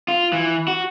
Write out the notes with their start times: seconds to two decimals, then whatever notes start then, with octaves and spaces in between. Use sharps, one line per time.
0.08 F4
0.33 E3
0.68 F#4